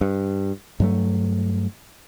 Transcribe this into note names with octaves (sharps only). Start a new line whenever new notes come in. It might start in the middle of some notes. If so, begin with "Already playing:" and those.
G2
G2 F#3 A3